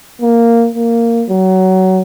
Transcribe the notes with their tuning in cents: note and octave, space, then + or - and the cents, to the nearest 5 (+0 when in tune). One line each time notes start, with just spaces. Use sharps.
A#3 -5
A#3 -10
F#3 +20